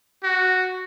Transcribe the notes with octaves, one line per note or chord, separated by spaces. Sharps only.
F#4